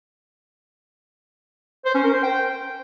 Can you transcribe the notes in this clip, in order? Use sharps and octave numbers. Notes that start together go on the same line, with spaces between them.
C5
C#4
A#4
C5
G5